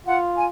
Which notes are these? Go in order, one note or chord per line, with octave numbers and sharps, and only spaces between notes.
F4 F#5
G#5